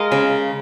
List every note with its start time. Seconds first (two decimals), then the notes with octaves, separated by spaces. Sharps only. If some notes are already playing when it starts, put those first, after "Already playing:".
Already playing: G#3 A#4 D#5 F5
0.12 C#3